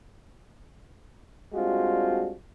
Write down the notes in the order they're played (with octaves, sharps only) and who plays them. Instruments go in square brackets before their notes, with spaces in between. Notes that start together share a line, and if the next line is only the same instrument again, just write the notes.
[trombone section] G3 G#3 C4 D4 F4 F#4